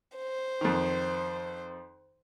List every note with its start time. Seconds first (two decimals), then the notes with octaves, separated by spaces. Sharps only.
0.18 C5
0.61 F2 D#3